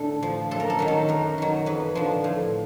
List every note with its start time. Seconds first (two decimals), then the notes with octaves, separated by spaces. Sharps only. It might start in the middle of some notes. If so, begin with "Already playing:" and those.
Already playing: A2 D3 A4
0.22 F3
0.51 F#2 A4
0.60 A#4
0.70 A4
0.79 D#3 F#3 A#4
0.88 A4
1.09 F#2 A#4
1.38 D#3 F#3
1.66 F2 B4
1.95 D3 F3
2.24 A2